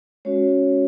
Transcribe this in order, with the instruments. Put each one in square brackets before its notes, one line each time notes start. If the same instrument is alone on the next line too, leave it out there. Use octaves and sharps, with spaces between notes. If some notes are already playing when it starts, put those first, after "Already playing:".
[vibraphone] G#3 C#4 F#4 C#5